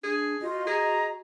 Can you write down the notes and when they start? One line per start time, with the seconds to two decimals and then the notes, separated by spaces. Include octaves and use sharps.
0.03 D4 G#4
0.42 F4 F#4 D#5
0.67 G#4 A#5